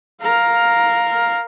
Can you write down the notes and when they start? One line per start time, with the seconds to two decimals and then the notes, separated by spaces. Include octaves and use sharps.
0.22 A#4 F5